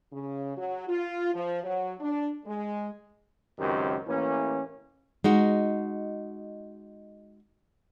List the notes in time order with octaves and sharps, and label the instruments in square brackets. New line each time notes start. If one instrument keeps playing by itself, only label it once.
[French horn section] C#3
F#3
F4
F3
F#3
D4
G#3
[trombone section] C#2 F#2 D#3 C4 G4
A1 E3 A#3 C#4
[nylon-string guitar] G#3 D#4 F#4